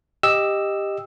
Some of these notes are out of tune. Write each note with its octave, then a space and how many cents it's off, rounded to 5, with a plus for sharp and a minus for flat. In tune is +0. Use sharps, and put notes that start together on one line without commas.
G4 +10 D#5 +0 E6 +0